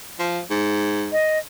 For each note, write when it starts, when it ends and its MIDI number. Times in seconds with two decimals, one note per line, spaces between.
0.19 0.40 53
0.50 1.12 44
1.12 1.39 75